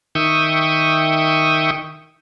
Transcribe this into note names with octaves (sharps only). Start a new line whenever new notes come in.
D#3 E5 G5 C#6 D#6